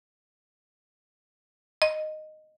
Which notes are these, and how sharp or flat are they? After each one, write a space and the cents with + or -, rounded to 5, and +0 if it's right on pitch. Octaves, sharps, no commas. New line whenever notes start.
D#5 -10